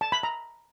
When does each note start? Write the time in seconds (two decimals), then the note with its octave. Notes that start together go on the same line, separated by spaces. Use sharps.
0.01 A5
0.12 B5
0.23 A#5